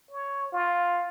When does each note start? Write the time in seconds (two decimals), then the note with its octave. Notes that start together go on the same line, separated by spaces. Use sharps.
0.11 C#5
0.52 F4